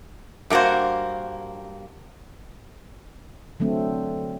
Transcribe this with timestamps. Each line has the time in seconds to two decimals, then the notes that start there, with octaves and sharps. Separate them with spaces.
0.50 G2 A3 A#3 F#4 C5
3.60 D3 F#3 A3 C4